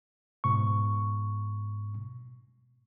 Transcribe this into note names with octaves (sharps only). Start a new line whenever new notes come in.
G#2 B2 C#6